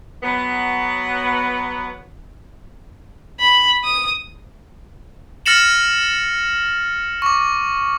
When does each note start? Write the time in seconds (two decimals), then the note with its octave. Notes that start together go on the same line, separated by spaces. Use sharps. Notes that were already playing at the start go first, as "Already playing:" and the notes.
0.23 F#3 B3
3.40 B5
3.84 D#6
5.46 F6 A6 A#6 C#7 E7 F#7
7.22 C#6 D6